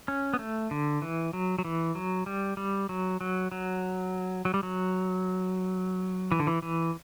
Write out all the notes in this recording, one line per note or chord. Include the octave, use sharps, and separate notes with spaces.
C#4
B3
A3
D3
E3
F#3
F#3
E3
F#3
G3
G3
F#3
F#3
F#3
F#3
G3
F#3
E3
D3
E3
E3